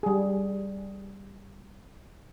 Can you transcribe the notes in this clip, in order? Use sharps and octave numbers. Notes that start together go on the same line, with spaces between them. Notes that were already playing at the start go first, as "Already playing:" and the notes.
G3 G#4